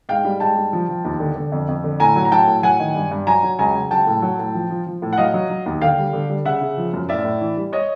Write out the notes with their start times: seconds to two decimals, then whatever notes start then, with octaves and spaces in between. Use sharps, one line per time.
0.09 G#2 F5 G5
0.25 G3
0.40 G#2 G5 A5
0.56 G3
0.73 F3
0.89 F3
1.04 D#2
1.20 D3
1.36 D3
1.52 F2
1.68 F2
1.84 D3
2.00 A2 G#5 A#5
2.16 F#3
2.25 A#5
2.31 F#3 G5 A5
2.47 A2
2.63 F#3 F#5 G#5
2.80 D#3
2.95 G2
3.11 G2
3.27 F#3 G#5 A#5
3.43 F#3
3.59 C#2 G#5 A#5
3.75 C#2
3.91 F#3 G5 A5
4.07 A2
4.22 F#3
4.39 A2
4.55 F3
4.70 F3
4.86 F3
5.02 A2
5.13 F#5
5.18 F#3 D#5 F5
5.34 F#3
5.50 F#3
5.66 D#2
5.81 D3 F5 G5
5.98 G3
6.13 D3
6.29 G3
6.45 C#3 E5 F#5
6.61 C#3
6.77 F3
6.93 F#2
7.09 A2 D5 E5
7.25 A2
7.41 E3
7.57 G3
7.73 C#5 D#5